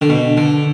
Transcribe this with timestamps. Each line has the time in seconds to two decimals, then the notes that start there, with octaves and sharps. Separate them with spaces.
0.01 D3
0.09 B2
0.37 D3